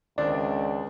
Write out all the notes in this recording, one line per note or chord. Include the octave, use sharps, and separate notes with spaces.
C#2 D#3 C4 D4 D5